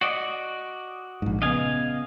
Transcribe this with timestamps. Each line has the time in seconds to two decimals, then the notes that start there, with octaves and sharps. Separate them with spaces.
0.01 F#4 D5 D#5
1.22 A#1 G#2
1.42 C#3 B3 D#5 F5 G#5